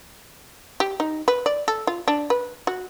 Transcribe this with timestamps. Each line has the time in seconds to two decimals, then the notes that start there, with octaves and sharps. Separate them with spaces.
0.80 G4
1.00 D#4
1.28 B4
1.46 D5
1.68 A4
1.87 F4
2.08 D4
2.30 B4
2.67 F#4